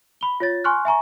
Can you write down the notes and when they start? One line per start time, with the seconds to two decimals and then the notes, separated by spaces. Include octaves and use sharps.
0.21 B5 G7
0.40 F4 C#5 A6
0.64 G#5 C6 C#6 F6 F#6
0.85 E5 G#5 A#5 C#6